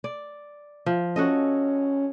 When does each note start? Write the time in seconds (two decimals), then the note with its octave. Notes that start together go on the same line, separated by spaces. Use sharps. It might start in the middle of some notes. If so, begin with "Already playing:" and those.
0.04 D5
0.86 F3
1.16 C#4 F#4 A4 D#5